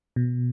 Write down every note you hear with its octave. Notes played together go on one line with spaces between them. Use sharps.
B2